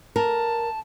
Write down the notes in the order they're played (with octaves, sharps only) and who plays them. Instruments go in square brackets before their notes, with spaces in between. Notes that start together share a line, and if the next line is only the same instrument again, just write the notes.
[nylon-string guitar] A#4 [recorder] A5